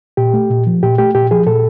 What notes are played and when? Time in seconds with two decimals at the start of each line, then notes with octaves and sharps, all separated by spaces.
0.17 A#2 G4
0.34 A3
0.50 A#2
0.67 F3
0.82 A#2 G4
0.98 A3 G4
1.15 A#2 G4
1.31 F3 G#4
1.46 A#2 A4